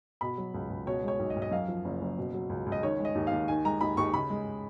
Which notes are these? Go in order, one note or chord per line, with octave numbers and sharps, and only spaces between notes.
B2 B5
F#3
C#2
C#2
B2 C#5
G#3 C#5
B1
D#5
B1
D#5
F#2 F5
F3
F#1
F#1
B2
F#3
C#2
C#2
D#5
D#3 C#5
G#3
D#5
D#2
D#2 F5
D#3 G#5
G#3 A#5
D#2 B5
D#2 C#6
C#3 B5
G#3